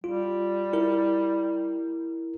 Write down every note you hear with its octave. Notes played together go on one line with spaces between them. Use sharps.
G3 F4
E4 A#4